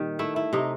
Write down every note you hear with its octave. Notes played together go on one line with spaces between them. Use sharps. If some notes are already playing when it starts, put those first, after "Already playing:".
Already playing: A#2 D#3 G3
A3 E4
E4
C3 D#4